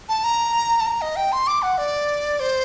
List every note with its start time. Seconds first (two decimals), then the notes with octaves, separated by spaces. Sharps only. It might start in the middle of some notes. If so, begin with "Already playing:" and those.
0.09 A5
0.24 A#5
0.80 A5
0.86 A#5
1.01 D#5
1.16 G5
1.32 C6
1.47 D6
1.62 F#5
1.78 D5
2.40 C5